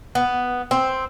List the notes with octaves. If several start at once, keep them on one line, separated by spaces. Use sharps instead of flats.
B3
C4